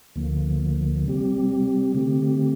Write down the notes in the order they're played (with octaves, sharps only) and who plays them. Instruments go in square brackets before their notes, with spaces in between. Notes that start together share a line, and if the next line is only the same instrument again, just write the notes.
[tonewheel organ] D2 D3 F3 A#3
C3 G3 C4 G4
D3 A3 C4 G4